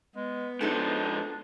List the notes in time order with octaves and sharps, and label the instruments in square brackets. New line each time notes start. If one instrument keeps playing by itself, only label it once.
[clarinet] G#3 [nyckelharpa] B3
[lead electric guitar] G#2 F3 [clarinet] D4 [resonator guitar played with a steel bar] D#4 F#4 A4